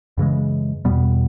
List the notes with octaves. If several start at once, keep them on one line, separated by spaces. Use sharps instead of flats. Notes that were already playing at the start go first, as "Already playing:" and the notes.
F#2 C#3 E3 G#3
E2 B2 G3 B3